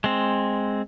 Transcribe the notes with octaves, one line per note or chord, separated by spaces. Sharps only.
G#3 C4